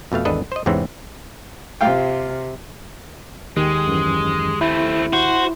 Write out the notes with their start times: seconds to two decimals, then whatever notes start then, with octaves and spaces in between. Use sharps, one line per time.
0.12 F2 B2 A3 F5
0.25 G#1 E2 D4 A4 B4 D#5
0.52 C5 D#5
0.66 E2 G#2 C3 E3 C4 C#4
1.81 C3 F4 F5 G5
3.57 D#2 D#3 G#3 G4
3.87 F#2 E3
4.61 A3 C4 E4
5.13 F#4 C5